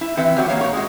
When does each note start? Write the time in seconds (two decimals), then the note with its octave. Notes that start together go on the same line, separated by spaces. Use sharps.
0.01 E4
0.17 E3 C4 B4 E5
0.36 G2 F#3 C4 F#4
0.48 A#3 B3 C#5 F5
0.61 A#2 C#5
0.73 G#3 F#4